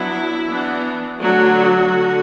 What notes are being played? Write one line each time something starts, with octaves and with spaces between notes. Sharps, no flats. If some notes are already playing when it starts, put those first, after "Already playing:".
Already playing: F#3 B3 D4 E4
E3 B3 D4
D3 F#3 A3 D4 F#4
D3